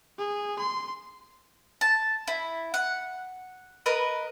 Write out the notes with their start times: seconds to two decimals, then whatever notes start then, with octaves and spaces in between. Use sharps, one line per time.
0.18 G#4
0.59 C6
1.81 A5
2.28 E4
2.74 F#5
3.86 A#4 B4 D#5